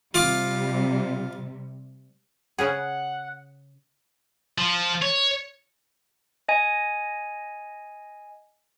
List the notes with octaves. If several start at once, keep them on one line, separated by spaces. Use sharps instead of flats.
C3 G3 F4 F5 D6
C#3 C#4 G#4 F#5
F3
C#5
D#5 G#5